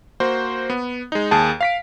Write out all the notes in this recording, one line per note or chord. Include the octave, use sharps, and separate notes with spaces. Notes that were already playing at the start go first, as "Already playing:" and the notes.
A#3 F#4 C5
B3
G#3 D#4
D#2 G#4 A5
F5 B6 D7